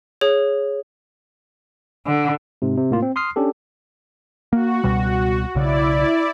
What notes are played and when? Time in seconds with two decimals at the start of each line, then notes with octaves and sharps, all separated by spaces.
0.21 G#4 C#5
2.06 D3
2.62 G#2 C3
2.77 C3
2.91 A2 A#3 F4
3.02 C4
3.16 C6 D#6 F6 C7
3.36 C#4 D4 G4 A4
4.53 A#3 F#4
4.84 C#2 B2 G3
5.55 B1 C#3 E4 D5